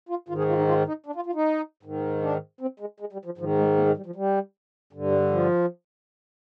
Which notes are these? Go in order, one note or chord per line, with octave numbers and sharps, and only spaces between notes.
F4
G#2 D#3 F4
G#4
F4
D#4
F4
D#4
D4
F4
F4
D#4
G#2 D#3
D4
C4
G#3
G#3
G3
F3
G#2 D#3 F3
G#3
A#3
G#3
G3
F3
G3
G2 D3
G3
F3